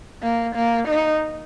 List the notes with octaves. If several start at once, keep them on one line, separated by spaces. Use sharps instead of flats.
A#3
A#3
D#4